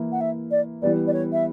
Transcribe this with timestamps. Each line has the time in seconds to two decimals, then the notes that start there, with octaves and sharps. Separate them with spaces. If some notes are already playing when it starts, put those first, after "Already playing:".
Already playing: E3 A#3 E4
0.12 F#5
0.21 E5
0.51 D5
0.82 E3 G3 B3 D5
1.07 D5
1.13 C#5
1.32 E5